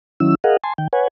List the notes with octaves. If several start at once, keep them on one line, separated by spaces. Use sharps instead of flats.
D#3 F#3 C#4 E4 E6
G#4 A#4 D#5 F5 F#5
G#5 A5 C6
D#3 G5
B4 C#5 F#5 G#5